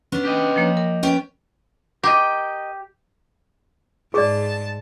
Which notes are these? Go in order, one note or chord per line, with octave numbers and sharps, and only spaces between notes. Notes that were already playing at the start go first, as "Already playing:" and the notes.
B3 C#4 D4
G4 D#5
F3 A#3 C#5
A#4
B3 C#4 G5
G4 A#4 D#5
G#2 G#4 D5 A5